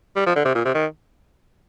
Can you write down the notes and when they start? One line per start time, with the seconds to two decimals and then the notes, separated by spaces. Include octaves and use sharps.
0.16 G3
0.26 F3
0.36 D3
0.45 C3
0.55 A#2
0.65 C3
0.74 D#3